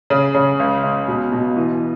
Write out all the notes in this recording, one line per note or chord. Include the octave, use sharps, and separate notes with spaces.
C#3
C#3
C#2
C#2
B2
B2
E3